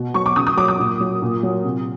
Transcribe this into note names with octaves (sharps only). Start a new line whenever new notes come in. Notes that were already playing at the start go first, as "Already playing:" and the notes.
Already playing: B2
F#3 C#6
D6
C#3 D#6
D#6
F#3 D6
D#6
A#2
F#3
A#2
F#3
C3